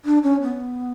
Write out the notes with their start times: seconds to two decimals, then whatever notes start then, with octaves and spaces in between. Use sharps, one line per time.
0.05 D4
0.23 C#4
0.42 B3